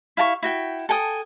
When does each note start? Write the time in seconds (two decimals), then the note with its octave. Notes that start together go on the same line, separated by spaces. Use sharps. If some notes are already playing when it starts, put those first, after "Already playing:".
0.17 E4 F5 A5 C#6
0.43 E4 F#4 G5
0.89 A4 G5 G#5 D#6